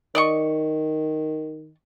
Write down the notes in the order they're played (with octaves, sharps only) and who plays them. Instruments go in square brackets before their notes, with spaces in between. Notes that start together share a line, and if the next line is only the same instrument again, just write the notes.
[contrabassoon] D#3 [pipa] D5 D#5 C#6